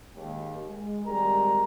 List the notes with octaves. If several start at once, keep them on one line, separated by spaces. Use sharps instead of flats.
D#2 G#3
G#3
G#1 G3 G#3 A#4 A#5